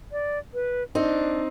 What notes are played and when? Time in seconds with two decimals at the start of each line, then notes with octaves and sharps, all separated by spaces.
0.12 D5
0.54 B4
0.95 C4 D4 D#4